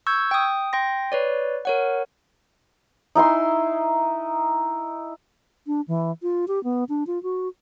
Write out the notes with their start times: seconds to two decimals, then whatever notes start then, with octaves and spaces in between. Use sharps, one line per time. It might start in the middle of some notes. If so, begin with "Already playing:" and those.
0.07 C#6 E6 G6 G#6
0.31 G5 D#6
0.73 G5 C6 A#6
1.12 B4 C#5 D5
1.65 A#4 C#5 F#5
3.15 D#4 E4 G#5 C6
5.67 D4
5.88 E3
6.22 F4
6.48 G4
6.64 B3
6.89 D4
7.07 F4
7.23 F#4